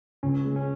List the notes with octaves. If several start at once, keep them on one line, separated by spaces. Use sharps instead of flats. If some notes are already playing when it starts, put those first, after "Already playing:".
C#2 C#4
G#3
C#4